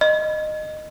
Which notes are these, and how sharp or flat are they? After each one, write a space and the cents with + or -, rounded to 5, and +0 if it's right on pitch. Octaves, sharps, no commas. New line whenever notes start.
D#5 -15